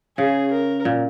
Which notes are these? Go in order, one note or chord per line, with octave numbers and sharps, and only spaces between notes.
C#3 G#4
A#4
A#2